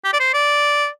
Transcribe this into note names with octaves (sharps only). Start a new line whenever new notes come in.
G4
D5
C5
D5